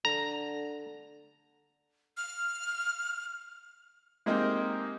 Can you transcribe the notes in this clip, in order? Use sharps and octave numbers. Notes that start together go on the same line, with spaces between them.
D3 A#5
F6
G#3 A#3 C4 D#4 G4 A#4